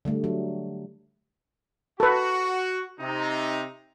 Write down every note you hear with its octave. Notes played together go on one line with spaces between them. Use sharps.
D3 G3 A3
F#3
F#4 A4 B4
C3 D#4